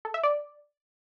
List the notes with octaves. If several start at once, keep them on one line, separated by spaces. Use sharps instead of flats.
A4
E5
D5